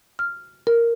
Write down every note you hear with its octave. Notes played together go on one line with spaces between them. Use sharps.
F6
A#4